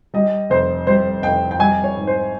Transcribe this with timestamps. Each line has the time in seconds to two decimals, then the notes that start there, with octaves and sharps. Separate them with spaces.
0.14 G3 D#5
0.50 F1 C5
0.87 G3 C5
1.22 F1 G5
1.51 G5
1.59 G3 G#5
1.84 C#5
1.96 G#2
2.07 C5